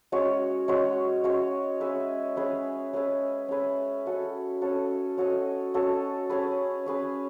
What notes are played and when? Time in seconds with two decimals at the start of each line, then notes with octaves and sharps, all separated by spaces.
0.12 G#3 C#4 F#4 C#5
0.68 G#3 C#4 F#4 C#5
1.24 G#3 C#4 F#4 C#5
1.80 C#4 G#4 B4 E5
2.36 C#4 G#4 B4 E5
2.93 C#4 G#4 B4 E5
3.48 C#4 G#4 B4 E5
4.06 C#4 F#4 A4 D#5
4.61 C#4 F#4 A4 D#5
5.17 C#4 F#4 A4 D#5
5.74 C#4 F#4 A4 D#5
6.29 C#4 G#4 B4
6.86 C#4 G#4 B4